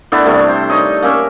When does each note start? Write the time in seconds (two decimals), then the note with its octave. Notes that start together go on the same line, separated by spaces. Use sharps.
0.12 A3 B3 D4 E4
0.25 C3 G3 A3
0.48 C5
0.69 D#4 C#5 D#5
1.02 A#3 C#4 E5 D6